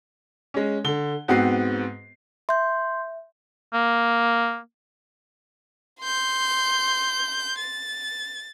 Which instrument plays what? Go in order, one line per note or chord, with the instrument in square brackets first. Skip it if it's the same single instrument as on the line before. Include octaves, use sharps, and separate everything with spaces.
[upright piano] G#3 C#4
D3 G7
G#2 B3 C4 F#4 C7
[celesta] E5 [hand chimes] C6 G6
[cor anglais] A#3
[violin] C6 G6
A6